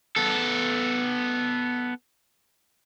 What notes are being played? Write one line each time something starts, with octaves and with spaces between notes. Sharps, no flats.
B3 A4